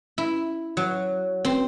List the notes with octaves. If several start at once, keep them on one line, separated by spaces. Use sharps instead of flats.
E4
F#3
C4